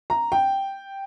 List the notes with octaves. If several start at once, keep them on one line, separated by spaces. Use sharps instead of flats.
A#5
G5